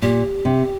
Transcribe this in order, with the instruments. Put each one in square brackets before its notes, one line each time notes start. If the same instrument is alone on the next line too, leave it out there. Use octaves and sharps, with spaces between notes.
[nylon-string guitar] A#2 [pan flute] G4
[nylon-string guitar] C3